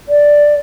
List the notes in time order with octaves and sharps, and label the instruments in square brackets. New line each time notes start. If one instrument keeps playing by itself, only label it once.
[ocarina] D5